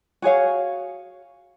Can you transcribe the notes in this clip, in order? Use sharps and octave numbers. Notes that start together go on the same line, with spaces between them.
F#4 G#4 C#5 F5